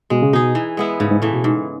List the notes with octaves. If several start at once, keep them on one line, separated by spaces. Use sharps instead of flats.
B2 G#3
C#3
B2 D#4 G#4
E3
G#3 B3 E4
G#2 C#3
G#2
A2 E3 A3
B2
G#2